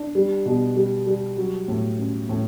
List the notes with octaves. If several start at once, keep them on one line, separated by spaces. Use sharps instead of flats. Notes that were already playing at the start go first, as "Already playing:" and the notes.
Already playing: D4
G3
B2
G3
G3
F#3
A2
C#4
A2